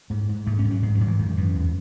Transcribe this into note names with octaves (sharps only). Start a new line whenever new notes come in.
G#2 A3
G#2
G#2 A3
C#4
G#2
F#3
G#2 G#3
F#3
G#2
E3
F#2 D#3
F#2 E3
E2